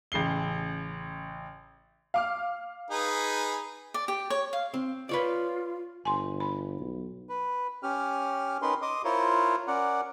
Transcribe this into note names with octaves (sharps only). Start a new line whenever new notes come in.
A1 C#3 C7 G7
F5 D6 F6
D#4 G#4 B4
D5
G4
C#5
F5
C4
F4 B4 C#5 D5
G1 G#5 C6
B5
B1
B4
C#4 G4 F6
C#4 D#4 A#4 B4 C6
D#5 C6 D6 D#6
E4 F4 A#4 C5 C#5
C#4 A#4 D5 F#5